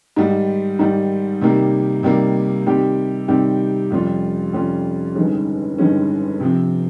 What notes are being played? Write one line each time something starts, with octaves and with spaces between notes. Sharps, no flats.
G#2 D#3 G3
G#2 D#3 G3
C3 D#3 G3 A#3
C3 D#3 G3 A#3
C3 D#3 G3 C4 G4
C3 D#3 G3 C4 G4
F2 C3 G3 C#4 F4
F2 C3 G3 C#4 F4
G1 G2 D#3 G#3 C#4
G1 G2 D#3 G#3 C#4
C3 F3 C4